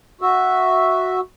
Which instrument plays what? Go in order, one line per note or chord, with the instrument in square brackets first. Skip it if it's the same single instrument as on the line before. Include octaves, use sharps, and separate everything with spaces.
[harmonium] F#4 E5